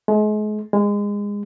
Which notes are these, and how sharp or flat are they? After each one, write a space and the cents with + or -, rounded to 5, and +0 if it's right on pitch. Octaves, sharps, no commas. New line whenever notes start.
G#3 +35
G#3 -25